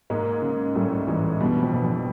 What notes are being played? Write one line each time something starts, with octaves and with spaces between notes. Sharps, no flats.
G#2 G#3 A#3
C#3
A2 G3 A3
G#2 E3 G#3
G2 B2 G3
F2 F3
B2 E3
F2 F3